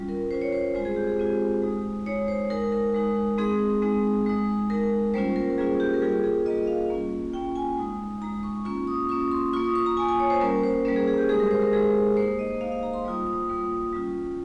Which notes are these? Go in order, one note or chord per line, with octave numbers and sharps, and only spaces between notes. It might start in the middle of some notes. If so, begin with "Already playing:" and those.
Already playing: G3 C#4 F4
A#4
G3 C#4 F4 C5
C#5
C5
G#3 C4 F4 C5
G#4
G4
G#4
G#3 C4 F4
G#3 D#4
G#3 D#4 C#5
C5
G#3 D#4 A#4
A#4
G#3 D#4
G#3 C4 D#4 G#4
G#3 C4 D#4
G#3 D#4
G#3 D#4 A#4
G3 A#3 C#4 F4 C5
A#4
G3 A#3 C#4 F4 G#4
G4
A#4
G3 A#3 F4 G#4
G#4
G3 A#3 F4 D#5
F5
A#3 C#4 F4
A#3 C#4 F4 G5
G#5
G#3 D#4
G#3 D#4 A#5
C#6
A#3 C#4 F4 C#6
D#6
A#3 C#4 F4 C#6
C6
A#3 F4 C#6
D#6
C#6
A#5
A#3 F4 G#5
G#5
C#5
C5
G3 A#3 C#4 A#4
C5
G3 A#3 C#4 A#4
G#4
G#4
G4
G#3 D#4 G#4
A#4
C5
A#4
G#3 D#4 G#4
A#3 D#4 C5
D#5
A#3 D#4 F5
F5
A#5
C6
G3 A#3 F4 D#6
D#6
G3 A#3 F4
G3 C#4 F4